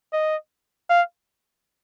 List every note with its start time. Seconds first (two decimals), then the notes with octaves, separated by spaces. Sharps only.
0.13 D#5
0.90 F5